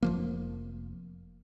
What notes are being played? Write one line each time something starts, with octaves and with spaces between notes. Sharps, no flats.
F1 F3 A#3